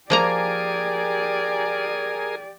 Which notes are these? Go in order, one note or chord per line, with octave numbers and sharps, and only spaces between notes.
F3 A#3 G4 G#4 A#4 D5 G#5 A#5